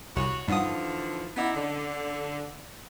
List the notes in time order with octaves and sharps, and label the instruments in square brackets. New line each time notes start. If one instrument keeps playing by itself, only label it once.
[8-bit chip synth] C2 [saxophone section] F#4 C#5 [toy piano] B5
[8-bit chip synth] G2 D#6 [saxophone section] D3 E3 F3 [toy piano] D#4 F5 F#5
[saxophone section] B3 D#4 E4 [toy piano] C#4 F#5 D6
[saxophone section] D3